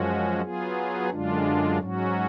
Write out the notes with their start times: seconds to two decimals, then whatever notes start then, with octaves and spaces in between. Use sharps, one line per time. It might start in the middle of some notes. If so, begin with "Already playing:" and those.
Already playing: F#2 F3 G#3 C#4 F#4
0.42 F#3 B3 F4 G#4
1.10 F#2 D3 G#3 D4 F4
1.79 G#2 F#3 C#4 F#4